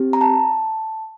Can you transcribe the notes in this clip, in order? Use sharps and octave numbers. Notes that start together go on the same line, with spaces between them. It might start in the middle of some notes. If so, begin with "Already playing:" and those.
Already playing: C4 G4
A#5
A5